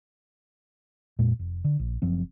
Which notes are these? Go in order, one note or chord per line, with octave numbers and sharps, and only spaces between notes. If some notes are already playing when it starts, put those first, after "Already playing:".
F2 A#2 G#3
F1
D3
A#1
F#1 F#2 F3 C4